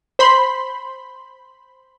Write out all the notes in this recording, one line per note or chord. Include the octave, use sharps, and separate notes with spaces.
C5 B5 C6